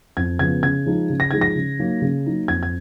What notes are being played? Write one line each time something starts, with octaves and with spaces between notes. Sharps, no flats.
F2 G#6
C#3 F3 B3 G#6
C#3 G#6
F3 G#3 D#4
C#3
A#6
F3 G#3 D#4 G#6
A#6
C#3
F#3 A#3 D#4
C#3
F#3 A#3 D#4
F2 G#6
G#6